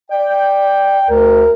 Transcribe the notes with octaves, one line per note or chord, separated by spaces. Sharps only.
D5 G5
D2 A#4